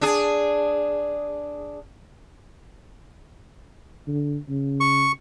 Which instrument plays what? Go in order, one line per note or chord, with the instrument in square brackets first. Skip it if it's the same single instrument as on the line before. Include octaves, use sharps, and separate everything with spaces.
[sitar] D4 G#4
[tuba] D3
C#3
[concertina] C#6